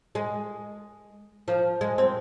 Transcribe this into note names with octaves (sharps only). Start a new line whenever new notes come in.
G#3
F3
G#3
C4